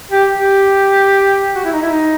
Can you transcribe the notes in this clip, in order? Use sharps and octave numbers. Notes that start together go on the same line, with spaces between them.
G4
G4
F#4
E4
D#4
E4
D#4